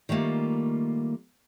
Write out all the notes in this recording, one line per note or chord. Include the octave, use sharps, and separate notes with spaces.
D#3 G3 A3 A#3 F4